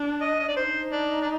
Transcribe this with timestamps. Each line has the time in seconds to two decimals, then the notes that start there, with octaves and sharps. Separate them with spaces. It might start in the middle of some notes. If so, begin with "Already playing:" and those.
Already playing: D4
0.22 D#5
0.40 D#5
0.48 D5
0.56 D#4 C5
0.92 D4
1.22 D4